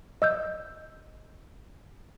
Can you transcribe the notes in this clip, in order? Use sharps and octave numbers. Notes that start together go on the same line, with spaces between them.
D#5 E6 G6